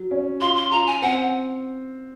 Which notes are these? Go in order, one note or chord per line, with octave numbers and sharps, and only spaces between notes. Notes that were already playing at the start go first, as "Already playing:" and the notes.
Already playing: F#3
C#4
F4 C6
C6
F4 A#5
G#5
C4 F#5